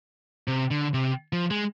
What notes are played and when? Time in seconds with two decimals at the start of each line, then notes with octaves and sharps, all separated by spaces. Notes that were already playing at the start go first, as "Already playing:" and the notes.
0.48 C3
0.71 D3
0.94 C3
1.33 F3
1.51 G#3